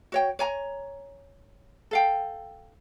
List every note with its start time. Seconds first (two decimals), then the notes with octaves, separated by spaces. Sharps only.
0.12 F#4 C#5 G5
0.39 C#5 G#5 A#5
1.91 A4 F5 G5